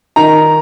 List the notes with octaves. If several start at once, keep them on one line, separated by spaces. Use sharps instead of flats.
D#3 A#5